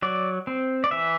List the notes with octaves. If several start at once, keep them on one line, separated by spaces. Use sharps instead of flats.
F#3 D5
C4
D5
E3 E5